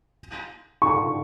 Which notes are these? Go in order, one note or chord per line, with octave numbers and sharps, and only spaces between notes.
C#6